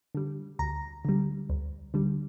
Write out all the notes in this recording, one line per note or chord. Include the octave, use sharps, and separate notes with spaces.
D3 G3
D2 A#5
D3 G3
D2
D3 G3